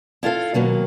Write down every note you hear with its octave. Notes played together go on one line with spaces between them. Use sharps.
E4 F4 A4 F5
B2 D#3 F#3 A#3